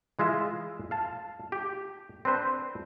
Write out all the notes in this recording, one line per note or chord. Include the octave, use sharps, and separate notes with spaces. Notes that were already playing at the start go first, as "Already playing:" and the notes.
E3 G#3 F4 E5
F5 A5
G4
C4 D4 B4 C5